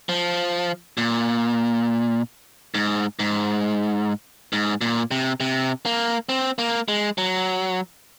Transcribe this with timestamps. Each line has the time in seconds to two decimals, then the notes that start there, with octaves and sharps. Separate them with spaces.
0.09 F3
0.97 A#2
2.75 G#2
3.19 G#2
4.53 G#2
4.81 A#2
5.11 C3
5.40 C3
5.86 A#3
6.29 C4
6.58 A#3
6.88 G#3
7.18 F#3